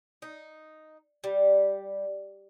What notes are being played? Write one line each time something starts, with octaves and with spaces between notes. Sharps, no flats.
D#4
G3